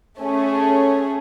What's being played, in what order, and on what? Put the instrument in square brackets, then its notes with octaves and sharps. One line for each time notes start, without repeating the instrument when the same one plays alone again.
[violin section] A3 C#4 G#4